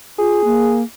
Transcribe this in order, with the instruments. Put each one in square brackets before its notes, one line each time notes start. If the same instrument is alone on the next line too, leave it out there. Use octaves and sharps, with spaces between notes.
[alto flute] F4 [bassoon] G#4
[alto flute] A#3